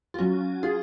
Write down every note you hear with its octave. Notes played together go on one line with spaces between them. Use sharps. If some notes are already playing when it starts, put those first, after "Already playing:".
F4
F#3 C#4 F#4
F4 G#4